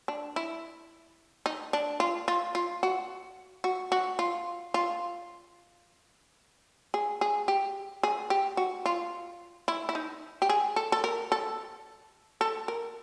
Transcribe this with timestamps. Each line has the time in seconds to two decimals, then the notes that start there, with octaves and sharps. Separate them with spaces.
0.08 D4
0.36 E4
1.46 D#4
1.73 D4
2.00 F4
2.28 F4
2.55 F4
2.83 F#4
3.64 F#4
3.92 F#4
4.19 F4
4.74 F4
6.94 G#4
7.21 G#4
7.48 G4
8.03 G#4
8.30 G4
8.57 F#4
8.86 F4
9.68 E4
9.89 E4
9.95 D#4
10.42 G4
10.49 G#4
10.76 A4
10.92 A4
11.04 A#4
11.32 A4
12.41 A4
12.68 A#4